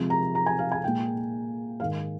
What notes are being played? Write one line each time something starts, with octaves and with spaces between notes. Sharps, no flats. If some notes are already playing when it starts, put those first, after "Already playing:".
Already playing: C3 F3 G#3
A#5
A#5
G#5
F5
G#5
A#2 G#3 G5
G#2 D#3 G#3 F5